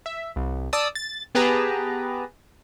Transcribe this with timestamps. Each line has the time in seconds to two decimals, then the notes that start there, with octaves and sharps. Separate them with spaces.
0.06 E5
0.36 C2
0.73 D5 A5 D#6 E6
0.95 A6
1.35 B3 G4 G#4 B4 A5 A#5